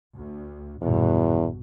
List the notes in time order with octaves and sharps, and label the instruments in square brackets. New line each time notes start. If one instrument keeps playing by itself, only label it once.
[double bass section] D2
[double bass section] A#1 G2 B2 [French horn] E2